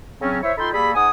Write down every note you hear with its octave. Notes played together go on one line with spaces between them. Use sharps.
C#3 F#3 C4 C#4
E4 C5 C#5 E5
D#4 F4 A4 G5 B5 C6
G3 A#3 G#4 A4 B5
G#2 F#5 G#5 D#6